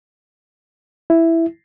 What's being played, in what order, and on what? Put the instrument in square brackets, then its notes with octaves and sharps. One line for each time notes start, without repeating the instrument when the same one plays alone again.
[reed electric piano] E4